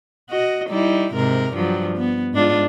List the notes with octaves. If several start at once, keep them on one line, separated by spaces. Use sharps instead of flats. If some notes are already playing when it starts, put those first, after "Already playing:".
F#4 D#5
G3 D#4 E4
G#2 C3 A#4
G2 F3 F#3
B3
G#2 D4 F4